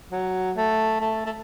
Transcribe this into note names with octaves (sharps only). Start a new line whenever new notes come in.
F#3
A3
A3
A3